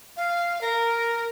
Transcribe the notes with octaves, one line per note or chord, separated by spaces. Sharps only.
F5
A#4